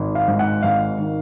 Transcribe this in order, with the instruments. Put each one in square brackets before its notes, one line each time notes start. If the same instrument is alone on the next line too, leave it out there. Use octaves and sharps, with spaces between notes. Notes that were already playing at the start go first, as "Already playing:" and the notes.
Already playing: [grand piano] G#1
F5
G#2
F#5
G#1 F5
D#3